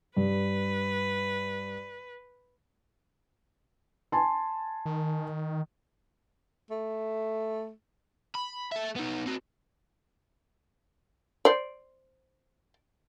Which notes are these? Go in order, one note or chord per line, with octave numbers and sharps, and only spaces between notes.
G2 B4
G#5 A5 C6
D#3
A3
B5
A4 E5
B3 D#4
C4 F#4
C5 D5